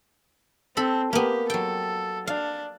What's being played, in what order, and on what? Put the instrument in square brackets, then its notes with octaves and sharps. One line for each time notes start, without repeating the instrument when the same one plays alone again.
[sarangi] C4 [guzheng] A4 B5
[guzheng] A#3 B3 [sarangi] G4
[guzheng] F#3 G5 [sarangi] A4
[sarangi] D4 [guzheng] F5